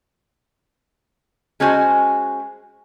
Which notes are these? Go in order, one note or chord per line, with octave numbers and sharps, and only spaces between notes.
G#3 C#4 F#4 C5 G#5